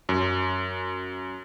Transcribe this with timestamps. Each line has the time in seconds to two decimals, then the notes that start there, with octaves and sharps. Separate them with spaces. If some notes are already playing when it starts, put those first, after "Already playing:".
0.09 F#2